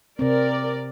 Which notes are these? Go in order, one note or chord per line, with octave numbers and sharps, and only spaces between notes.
C3 C4 A#4 D5